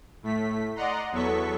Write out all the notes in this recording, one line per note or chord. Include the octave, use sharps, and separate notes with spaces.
A2 A3 B6
D5 D#5 F#5 A#5 C6
E2 F#3 B3 A4 C#6 B6